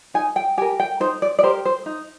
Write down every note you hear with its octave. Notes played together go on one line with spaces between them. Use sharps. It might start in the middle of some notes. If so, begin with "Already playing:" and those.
D#4 G#5
G5
G4 A#4 G#5
G5
D#4 C5
D5
D5
G4 A#4 C5
C5
D#4